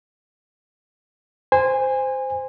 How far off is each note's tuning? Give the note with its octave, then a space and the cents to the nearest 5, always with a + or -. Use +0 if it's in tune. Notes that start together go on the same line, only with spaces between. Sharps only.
C5 -10 G#5 -25